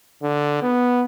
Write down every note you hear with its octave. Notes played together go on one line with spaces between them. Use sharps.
D3
B3